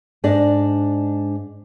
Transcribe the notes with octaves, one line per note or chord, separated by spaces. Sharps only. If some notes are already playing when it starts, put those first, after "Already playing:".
G#2 D4 D5 D#5